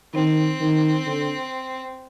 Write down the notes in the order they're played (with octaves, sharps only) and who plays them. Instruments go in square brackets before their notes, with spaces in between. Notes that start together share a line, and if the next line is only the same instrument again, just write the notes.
[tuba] D#3 [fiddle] C4
[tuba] D#3
D3